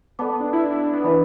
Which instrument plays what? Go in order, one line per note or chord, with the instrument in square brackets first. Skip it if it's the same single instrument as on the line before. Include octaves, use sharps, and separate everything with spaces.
[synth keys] B3 [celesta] A4 D5 A5 D6
[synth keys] B3
D4
E4
D4
E4
D4
B3
[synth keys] E3 [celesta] D4 B4 D5 B5